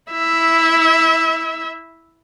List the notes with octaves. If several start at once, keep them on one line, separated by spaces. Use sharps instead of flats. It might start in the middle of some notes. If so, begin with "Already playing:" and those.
E4 E5